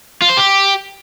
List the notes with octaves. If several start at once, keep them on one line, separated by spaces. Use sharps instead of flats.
F4
C5
G4